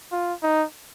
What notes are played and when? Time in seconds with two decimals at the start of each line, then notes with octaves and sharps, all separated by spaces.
0.12 F4
0.43 D#4